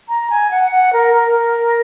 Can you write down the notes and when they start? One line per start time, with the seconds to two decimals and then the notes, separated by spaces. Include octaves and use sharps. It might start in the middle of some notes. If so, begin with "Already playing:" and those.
0.09 A#5
0.30 G#5
0.51 F#5
0.71 F#5
0.93 A#4
1.14 A#4